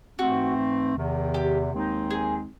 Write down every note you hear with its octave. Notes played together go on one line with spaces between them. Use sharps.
G#2 E3 A3 C4 F#4
E2 C3 D#3
G4
D#2 D#3 G#3 C4 D#4
G#4